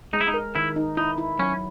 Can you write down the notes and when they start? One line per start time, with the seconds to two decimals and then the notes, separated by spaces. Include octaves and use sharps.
0.13 G#3 D#4
0.21 E4
0.27 D#4
0.34 A#4
0.55 D#3 E4
0.76 D#4
0.97 D#4 E4
1.18 E4
1.39 F#3 C#4